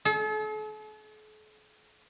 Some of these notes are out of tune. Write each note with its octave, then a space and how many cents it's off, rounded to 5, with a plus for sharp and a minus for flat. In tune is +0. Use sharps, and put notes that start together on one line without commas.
A4 -45